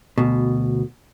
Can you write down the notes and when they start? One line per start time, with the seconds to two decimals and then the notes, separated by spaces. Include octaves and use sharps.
0.18 D2 B2